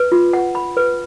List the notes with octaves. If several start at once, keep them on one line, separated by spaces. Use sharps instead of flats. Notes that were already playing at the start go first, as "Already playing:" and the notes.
Already playing: B4
F4
F#5
B5
B4